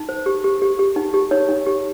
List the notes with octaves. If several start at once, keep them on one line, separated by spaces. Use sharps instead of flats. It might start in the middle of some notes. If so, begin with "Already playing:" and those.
Already playing: D#4
C5
G4
G4
G4
G4
D#4
G4
D#4 C#5
D#4
G4